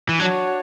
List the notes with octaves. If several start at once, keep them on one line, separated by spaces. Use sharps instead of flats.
E3
F#3 D4 F#4 C#5